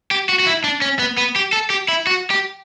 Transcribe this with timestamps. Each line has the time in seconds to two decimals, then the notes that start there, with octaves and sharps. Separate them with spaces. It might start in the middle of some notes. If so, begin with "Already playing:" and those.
0.11 G4
0.29 F#4
0.40 F#4
0.46 E4
0.64 D4
0.82 C#4
0.99 B3
1.17 B3
1.36 G4
1.53 A4
1.70 G4
1.88 E4
2.07 F#4
2.31 G4